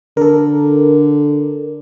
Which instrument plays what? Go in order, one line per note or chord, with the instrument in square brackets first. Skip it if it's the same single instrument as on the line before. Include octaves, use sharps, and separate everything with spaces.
[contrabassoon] D3 [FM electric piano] A4 A#4